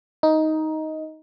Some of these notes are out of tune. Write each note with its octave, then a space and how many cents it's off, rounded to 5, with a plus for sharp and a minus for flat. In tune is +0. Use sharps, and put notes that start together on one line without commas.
D#4 +10